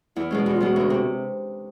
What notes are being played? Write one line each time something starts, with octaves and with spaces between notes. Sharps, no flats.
E2 E4
B2 G#3 C#4
E2 F#4
F4
B2 G#3 B3 F#4
D2
C3